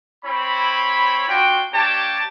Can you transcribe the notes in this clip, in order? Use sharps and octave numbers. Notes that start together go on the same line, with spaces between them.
C4 E4 C#5 B5
D4 F4 F#4 G5
A#3 D4 G4 C#5 G5 A5